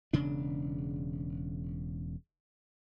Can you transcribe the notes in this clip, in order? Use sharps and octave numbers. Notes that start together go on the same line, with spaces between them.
E1 C#3 D4